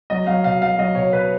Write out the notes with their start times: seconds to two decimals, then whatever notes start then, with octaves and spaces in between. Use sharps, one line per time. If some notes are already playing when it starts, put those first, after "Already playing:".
0.10 F#3 D#5
0.27 F#3 F5
0.44 B2 F5
0.62 F#3 F5
0.79 F#3 D#5
0.95 B2 C#5
1.13 B2 B4